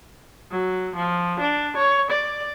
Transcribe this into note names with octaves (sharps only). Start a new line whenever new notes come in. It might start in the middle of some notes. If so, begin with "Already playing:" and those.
F#3
F3
D4
C#5
D5